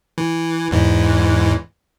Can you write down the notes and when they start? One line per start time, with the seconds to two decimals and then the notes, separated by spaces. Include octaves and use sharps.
0.18 E3
0.71 E2 G#2 E3